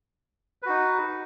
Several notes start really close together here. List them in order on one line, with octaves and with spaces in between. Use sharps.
B4 F#4 D#4